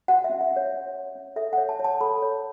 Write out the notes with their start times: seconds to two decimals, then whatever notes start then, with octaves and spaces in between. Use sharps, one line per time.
0.08 F#4 F#5
0.24 E5
0.30 C#4
0.41 E5
0.51 C#4
0.56 C#5
0.72 C#4
0.94 C#5
1.15 C#4
1.36 A4 E5
1.53 C#5 F#5
1.69 A5
1.79 C#5
1.84 A5
2.01 A4 B5
2.22 C#5